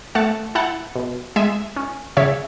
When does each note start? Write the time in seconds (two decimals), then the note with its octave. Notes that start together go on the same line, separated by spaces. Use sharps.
0.15 A3 F#5 A5
0.55 E4 F#5 A5
0.96 B2
1.36 G#3 E5 G#5
1.76 C#4
2.17 C#3 C#5 E5